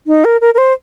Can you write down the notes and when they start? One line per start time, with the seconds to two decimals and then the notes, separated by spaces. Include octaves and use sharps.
0.07 D#4
0.25 A#4
0.41 A#4
0.54 A#4
0.58 C5